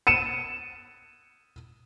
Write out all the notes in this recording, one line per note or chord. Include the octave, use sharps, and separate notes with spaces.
C#7 D#7 E7